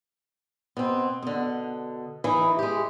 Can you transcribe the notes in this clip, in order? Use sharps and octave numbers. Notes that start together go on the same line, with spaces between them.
B2 C4
B2 D3
E3 D#4
G#3 G4